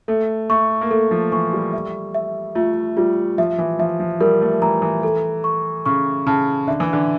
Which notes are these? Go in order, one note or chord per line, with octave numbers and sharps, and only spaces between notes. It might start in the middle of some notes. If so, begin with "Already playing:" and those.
A3 A4
A3 C#6
A#3
A3 A4
F3
E3 C#6
G3
E5
E5
A3 F4
G3 F4
F3 E5
E3
F3 E5
F3
G3 A#4
A3
E3 A#5
E3
A4
C#6
C#3 C#6
C#3 A5
D3 E5
E3
D3